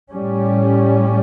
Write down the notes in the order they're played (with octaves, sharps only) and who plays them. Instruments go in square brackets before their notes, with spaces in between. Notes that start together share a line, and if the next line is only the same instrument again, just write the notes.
[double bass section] A2 G3 C#4